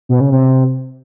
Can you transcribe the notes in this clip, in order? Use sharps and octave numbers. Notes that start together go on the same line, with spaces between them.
B2
C#3
C3